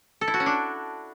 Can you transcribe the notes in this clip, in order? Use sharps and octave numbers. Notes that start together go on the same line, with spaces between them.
A4
E4
F#4
C#4
D4